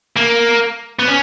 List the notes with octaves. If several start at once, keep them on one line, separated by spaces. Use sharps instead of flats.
A#3
B3
C#4